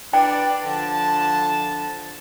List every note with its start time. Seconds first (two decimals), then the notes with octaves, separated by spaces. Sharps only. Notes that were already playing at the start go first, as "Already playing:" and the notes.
0.13 D4 B4 D5 G5
0.64 D3 F3 A5